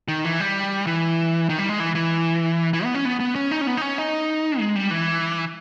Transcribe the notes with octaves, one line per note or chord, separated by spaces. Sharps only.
D#3
E3
G3
E3
D#3
G3
G#3
E3
E3
E3
B3
C#4
B3
B3
C#4
D#4
C#4
B3
D#4
C#4
D#4
G#3
G3
E3